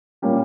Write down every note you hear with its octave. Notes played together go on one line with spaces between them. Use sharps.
A#2 G3 A#3 C#4 G4